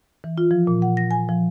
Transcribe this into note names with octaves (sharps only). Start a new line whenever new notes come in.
E3
F4
F3
A#2
F#5
A#6
G#5
F3